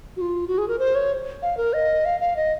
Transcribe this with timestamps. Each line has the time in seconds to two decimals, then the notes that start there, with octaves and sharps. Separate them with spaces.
0.17 F#4
0.21 F4
0.48 F#4
0.58 G#4
0.68 A#4
0.79 C5
0.95 C#5
1.42 F5
1.57 A#4
1.73 D#5
2.05 F5
2.20 F5
2.36 D#5